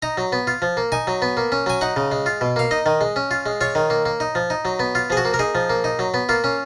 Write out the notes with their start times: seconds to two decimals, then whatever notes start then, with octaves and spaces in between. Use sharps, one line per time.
0.02 D#4 A#5
0.18 F#3
0.32 B3
0.47 F4
0.62 F3
0.77 A#3
0.92 D#4 G#5
1.07 F#3
1.22 B3
1.37 A#3
1.52 C#4
1.66 F#3 G#5
1.81 D#4 F#5
1.96 C#3
2.12 G#3
2.26 F4
2.41 B2
2.56 A#3 F5
2.71 D#4 D#5
2.86 D#3
3.01 G#3
3.16 C#4
3.31 F4
3.46 G#3
3.61 F4 C#5
3.75 D#3
3.90 A#3
4.06 A#3
4.20 D#4
4.35 F3
4.50 D#4
4.65 F#3
4.80 B3
4.95 F4
5.10 F3 G#4
5.17 F#4
5.25 A#3
5.34 A#4
5.39 D#4 G#4
5.55 F3
5.70 A#3
5.84 D#4
5.99 F#3
6.14 B3
6.29 A#3 F4
6.44 C#4